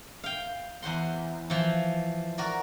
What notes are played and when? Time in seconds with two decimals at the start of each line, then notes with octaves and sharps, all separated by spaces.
0.24 F5 G5
0.83 E2 C5 F#5 C6
1.50 E3 F3
2.38 F#4 A#4 D5